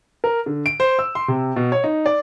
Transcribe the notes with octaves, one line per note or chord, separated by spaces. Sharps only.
A#4
D3
D7
C5
E6
C6
C3
B2
C#5
D#4
D5